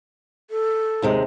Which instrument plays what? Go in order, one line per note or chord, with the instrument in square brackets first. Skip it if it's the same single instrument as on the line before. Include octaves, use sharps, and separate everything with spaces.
[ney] A4
[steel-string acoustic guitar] D#2 C3 G#3